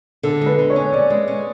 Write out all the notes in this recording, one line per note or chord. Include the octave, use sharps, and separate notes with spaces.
D3 A4
G#3 B4
D3
C#5
C#4
C#4 D5
G#3
C#4